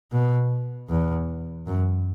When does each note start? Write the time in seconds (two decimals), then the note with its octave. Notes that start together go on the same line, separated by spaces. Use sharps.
0.12 B2
0.89 E2
1.67 F#2